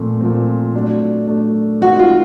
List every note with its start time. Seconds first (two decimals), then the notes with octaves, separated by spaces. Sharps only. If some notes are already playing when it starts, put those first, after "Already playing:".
Already playing: A#2 F3 A3 C4
0.21 A#2 F3 A3 C4
0.74 F#3 A3 D4
1.27 F#3 A3 D4
1.81 G#3 C4 D#4 F#4
1.99 F4